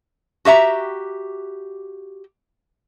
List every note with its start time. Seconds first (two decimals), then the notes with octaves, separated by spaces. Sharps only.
0.45 F#4 G4 E5 A#5